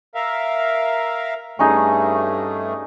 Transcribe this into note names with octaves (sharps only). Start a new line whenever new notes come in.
A#4 E5 F5
G2 A3 C#4 D#4 G#4